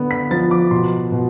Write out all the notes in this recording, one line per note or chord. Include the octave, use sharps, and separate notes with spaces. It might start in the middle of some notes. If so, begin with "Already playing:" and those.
Already playing: D3 B3
B6
F3 A6
D6
B2 C6
B2